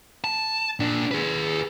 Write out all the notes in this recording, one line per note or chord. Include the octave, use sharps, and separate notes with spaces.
A5
A#2 D4
G#4 B4